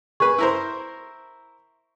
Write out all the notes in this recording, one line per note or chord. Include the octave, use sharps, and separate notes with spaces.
G#4 B4 C#6
E4 A#4 C5